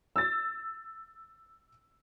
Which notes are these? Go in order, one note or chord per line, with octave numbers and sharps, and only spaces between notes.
E6 A6